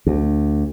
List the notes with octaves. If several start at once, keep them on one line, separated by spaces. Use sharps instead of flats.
D2